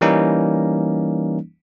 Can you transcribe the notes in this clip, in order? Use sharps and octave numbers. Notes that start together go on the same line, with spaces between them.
E3 G3 A#3 C#4 D#4